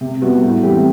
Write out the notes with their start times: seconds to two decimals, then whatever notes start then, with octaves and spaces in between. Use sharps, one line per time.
0.01 C3
0.22 G3 B3 F#4
0.42 A2
0.63 E3 G3 C4 G4